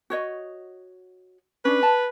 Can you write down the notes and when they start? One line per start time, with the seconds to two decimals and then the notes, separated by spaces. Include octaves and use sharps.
0.10 F#4 C#5 D#5
1.65 C#4 D4 B4
1.83 A5